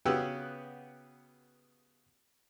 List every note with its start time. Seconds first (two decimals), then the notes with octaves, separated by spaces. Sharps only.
0.05 C#3 B3 F#4 G4 E6